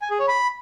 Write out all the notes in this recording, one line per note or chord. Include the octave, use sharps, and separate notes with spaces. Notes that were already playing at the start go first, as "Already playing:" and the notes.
G#5
G#4
C#5
B5